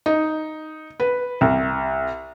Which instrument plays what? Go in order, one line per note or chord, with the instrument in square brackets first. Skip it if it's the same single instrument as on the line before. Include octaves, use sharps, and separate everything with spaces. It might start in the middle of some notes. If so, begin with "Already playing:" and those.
[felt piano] D#4
B4
C2